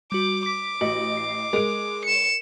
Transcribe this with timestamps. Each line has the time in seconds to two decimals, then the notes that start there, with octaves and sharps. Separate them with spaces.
0.12 G3 F#4 D6
0.46 D6 B6
0.81 A1 F#4 D#5
1.17 C7
1.53 G#3 A#4 D7
2.06 C#7 E7